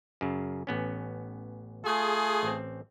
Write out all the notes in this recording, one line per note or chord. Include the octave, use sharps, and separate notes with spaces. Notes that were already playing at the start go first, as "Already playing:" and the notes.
F#2 C#3
A1 B3 C#4
A3 F4 G#4
A1 C4